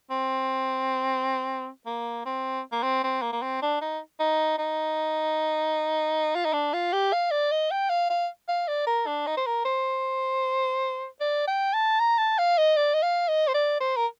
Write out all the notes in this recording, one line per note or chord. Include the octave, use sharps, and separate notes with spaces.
C4
A#3
C4
A#3
C4
C4
A#3
A#3
C4
D4
D#4
D#4
D#4
F4
D#4
D4
F4
G4
F5
D5
D#5
G5
F5
F5
F5
D5
A#4
D4
D#4
C5
A#4
C5
D5
G5
A5
A#5
A5
F5
D#5
D5
D#5
F5
D#5
C5
D5
C5
A#4